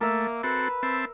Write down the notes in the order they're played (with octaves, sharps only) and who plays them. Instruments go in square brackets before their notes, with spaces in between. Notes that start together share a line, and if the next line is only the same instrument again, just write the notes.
[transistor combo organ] A3 [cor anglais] A#3 [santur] A#4 E5
[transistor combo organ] C4 F#4 A4 [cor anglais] B4
[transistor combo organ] C4 E5 A5